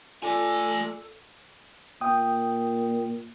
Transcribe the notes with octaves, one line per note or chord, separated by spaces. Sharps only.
A3 F4 A4 D5 G#5 D6
A#2 G5 D#6